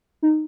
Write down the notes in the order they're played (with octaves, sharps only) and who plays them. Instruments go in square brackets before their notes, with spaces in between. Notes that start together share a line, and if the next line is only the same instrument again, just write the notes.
[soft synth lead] D#4